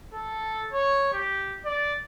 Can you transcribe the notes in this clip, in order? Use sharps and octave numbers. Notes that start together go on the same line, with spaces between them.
A4
C#5
G4
D5